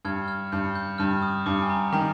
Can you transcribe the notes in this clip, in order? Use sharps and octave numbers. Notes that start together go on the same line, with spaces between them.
G2 F6 G#6
F6 G#6
G2 G6
G6
G2 F6
D#6
G2 D6
G#5
A#5
D#3 A#5